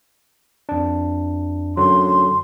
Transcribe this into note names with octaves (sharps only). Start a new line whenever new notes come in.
F2 D4
F#2 D3 F#3 C6